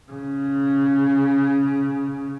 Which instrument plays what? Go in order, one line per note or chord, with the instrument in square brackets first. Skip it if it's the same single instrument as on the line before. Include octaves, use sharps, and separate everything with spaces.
[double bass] C#3